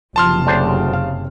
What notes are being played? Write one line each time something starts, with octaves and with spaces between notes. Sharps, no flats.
F#1 C3 F3 A5 C6 F6
D2 C#3 D4 C5
F5